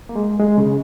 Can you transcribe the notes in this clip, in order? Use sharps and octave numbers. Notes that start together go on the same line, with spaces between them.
A#3
G#3
G#3
C#3